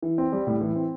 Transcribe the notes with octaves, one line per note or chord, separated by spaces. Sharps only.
E3
C4
G3
A2
E3
C4